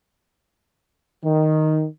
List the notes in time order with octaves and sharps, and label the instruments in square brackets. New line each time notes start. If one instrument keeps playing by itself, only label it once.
[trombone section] D#3